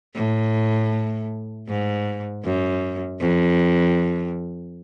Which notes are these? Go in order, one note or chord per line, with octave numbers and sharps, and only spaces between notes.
A2
G#2
F#2
F2